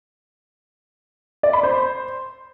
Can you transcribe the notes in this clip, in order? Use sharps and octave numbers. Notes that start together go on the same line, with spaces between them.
D5
B5
C5